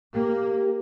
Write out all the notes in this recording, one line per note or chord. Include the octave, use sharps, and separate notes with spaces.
A#3 G4